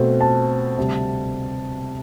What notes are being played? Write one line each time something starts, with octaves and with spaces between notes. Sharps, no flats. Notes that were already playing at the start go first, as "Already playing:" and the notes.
Already playing: B2 A3 C4
A5
D2 C3 G3